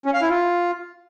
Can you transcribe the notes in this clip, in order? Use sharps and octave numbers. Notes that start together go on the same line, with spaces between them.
C#4
F5
E4
F4